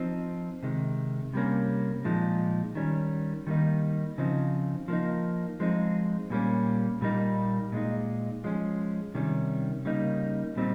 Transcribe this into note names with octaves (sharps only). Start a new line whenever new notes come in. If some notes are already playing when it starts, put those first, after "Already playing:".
Already playing: F3 C4 D#4
C3 D#3 G#3
C3 G3 A#3 C#4
A#2 F3 G#3 D#4
D#3 G3 C#4
D#3 G3 A#3 D#4
C#3 F3 C4 D#4
F3 A#3 D#4
F3 G#3 C4 D#4
A#2 G3 A#3 C#4
A#2 G3 A#3 D#4
A#2 G#3 D#4
F3 G#3 C#4
C3 D#3 G3 C#4
C#3 G3 A#3 D#4
A#2 G3 C4 D#4